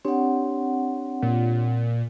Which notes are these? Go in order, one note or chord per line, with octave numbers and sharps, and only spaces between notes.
C4 D4 G4 C#5 F#5
A#2